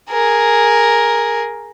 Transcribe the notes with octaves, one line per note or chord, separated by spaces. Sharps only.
G#4 A#4